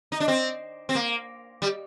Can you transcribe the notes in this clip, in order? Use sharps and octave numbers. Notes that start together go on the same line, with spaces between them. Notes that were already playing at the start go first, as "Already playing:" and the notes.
D#4
D4
C4
C4
A#3
G3